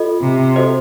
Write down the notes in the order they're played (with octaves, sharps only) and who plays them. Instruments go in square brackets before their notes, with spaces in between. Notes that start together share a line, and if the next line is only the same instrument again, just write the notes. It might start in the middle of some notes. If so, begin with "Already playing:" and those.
Already playing: [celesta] F4 A4 D#5
[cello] C3
[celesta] F#4 A4 C5 D#5